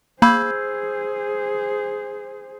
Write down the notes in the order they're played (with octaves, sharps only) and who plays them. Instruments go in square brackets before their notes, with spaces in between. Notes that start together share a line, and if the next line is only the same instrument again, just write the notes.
[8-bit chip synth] A#3 [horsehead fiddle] G#4 C5 [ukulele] B5 [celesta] E6 G6 G#6